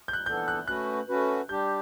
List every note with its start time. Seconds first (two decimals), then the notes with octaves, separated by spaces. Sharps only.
0.08 G6
0.13 F#6
0.26 E3 B3 D4 A4 G6
0.48 F#6
0.68 A3 C#4 F#4 B4 F#6
1.09 A3 C#4 F#4 B4
1.49 G3 D4 G4 G6